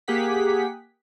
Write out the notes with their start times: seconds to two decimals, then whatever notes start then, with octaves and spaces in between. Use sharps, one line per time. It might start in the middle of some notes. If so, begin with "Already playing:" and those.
0.08 A#3 G4 G#4 F#5 B6